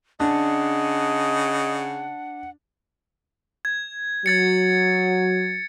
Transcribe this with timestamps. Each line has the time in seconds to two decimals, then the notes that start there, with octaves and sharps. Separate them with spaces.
0.20 C#3 D4 D#5 F#5
3.65 G#6
4.26 F#3 G#6 A6 C#7